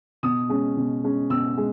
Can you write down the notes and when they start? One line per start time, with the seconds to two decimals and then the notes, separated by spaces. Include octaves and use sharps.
0.23 B2 D#6
0.49 G#3 C#4
0.77 B2
1.04 G#3 C#4
1.30 B2 E6
1.57 G#3